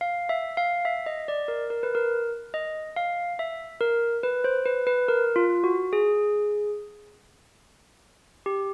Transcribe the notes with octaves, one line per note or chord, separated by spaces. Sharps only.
F5
E5
F5
E5
D#5
D5
A#4
A#4
B4
A#4
D#5
F5
E5
A#4
B4
C5
B4
B4
A#4
F4
F#4
G#4
G4